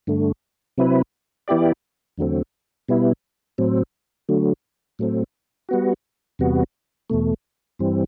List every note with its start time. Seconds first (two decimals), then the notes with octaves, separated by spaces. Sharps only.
0.07 G2 D3 A3
0.78 C3 F#3 C4 E4 B4
1.48 E3 B3 E4 G4 D5
2.18 E2 D3 F#3 A3 C4
2.89 B2 G3 B3 E4
3.58 A2 F#3 C4
4.29 D3 F#3 A3
4.99 A2 F#3 A3 C4
5.69 G3 B3 F#4
6.39 E2 C3 G3 B3 F#4
7.10 E2 B2 A3
7.79 G2 E3 G3 C4